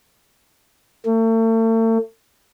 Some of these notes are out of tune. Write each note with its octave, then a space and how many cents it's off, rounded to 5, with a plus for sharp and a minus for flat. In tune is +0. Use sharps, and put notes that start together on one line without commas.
A3 +40